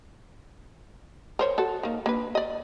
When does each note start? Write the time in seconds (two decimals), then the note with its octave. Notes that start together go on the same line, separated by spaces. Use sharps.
1.39 A#4 C5 C#5
1.58 F#4 A4
1.83 D#3 A#3
2.06 A#3 D4 B4
2.35 D5 D#5